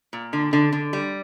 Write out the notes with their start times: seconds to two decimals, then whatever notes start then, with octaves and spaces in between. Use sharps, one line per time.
0.13 A#2
0.33 D3
0.53 D3
0.72 D3
0.93 G3